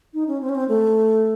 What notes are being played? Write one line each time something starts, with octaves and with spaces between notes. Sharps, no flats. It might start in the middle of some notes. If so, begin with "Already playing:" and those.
D#4
C#4
C4
C#4
C4
A3